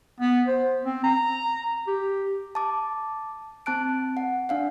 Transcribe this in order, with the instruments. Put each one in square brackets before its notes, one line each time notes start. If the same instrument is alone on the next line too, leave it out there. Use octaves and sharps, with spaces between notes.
[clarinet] B3
C5
C4
A#5
G4
[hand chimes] A5 D6
C4 A5 F#6 D7
F#5
D4 F5 F#5